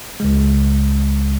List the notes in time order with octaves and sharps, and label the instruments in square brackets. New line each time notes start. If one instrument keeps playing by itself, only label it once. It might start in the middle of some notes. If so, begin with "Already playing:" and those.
[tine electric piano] C#2 C#3 G#3